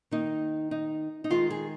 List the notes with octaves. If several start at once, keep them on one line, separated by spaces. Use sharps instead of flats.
D#3 A#3 D#4
D#4
D#4
D#3 G#3 F4
G#4